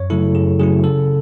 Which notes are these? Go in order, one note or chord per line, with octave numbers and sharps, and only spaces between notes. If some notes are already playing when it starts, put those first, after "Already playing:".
Already playing: F#2 C#5
C#3 F#3 A3 E4 A4
F#2 G#4
C#3 F#3 A3 E4 G#4
C#3 A4